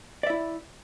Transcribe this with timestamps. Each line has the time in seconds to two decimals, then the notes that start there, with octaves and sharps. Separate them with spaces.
0.23 D5
0.27 E5
0.30 E4